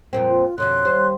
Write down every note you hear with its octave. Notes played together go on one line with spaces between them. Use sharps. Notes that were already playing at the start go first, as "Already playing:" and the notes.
F2 A#2 C4
F4
F2 B2 D3 C#5 C6 F#6
D#2 G3 C5